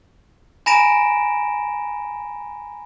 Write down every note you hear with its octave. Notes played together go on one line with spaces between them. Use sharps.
G#5 A#5 B5 A#6 D7 E7